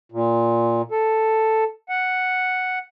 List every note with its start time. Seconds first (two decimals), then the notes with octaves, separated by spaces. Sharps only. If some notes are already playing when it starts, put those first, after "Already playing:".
0.12 A#2
0.91 A4
1.89 F#5